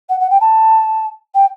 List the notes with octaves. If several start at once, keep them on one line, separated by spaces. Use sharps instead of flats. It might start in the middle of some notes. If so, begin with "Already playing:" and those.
F#5
F#5
G5
A5
G5